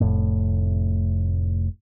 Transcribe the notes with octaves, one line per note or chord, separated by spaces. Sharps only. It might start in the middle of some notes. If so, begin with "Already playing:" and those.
F1 A2